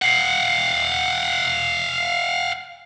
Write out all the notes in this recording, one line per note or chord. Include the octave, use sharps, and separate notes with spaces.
F5 F#5